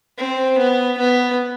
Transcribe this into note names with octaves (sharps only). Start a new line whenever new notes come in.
C4
B3
B3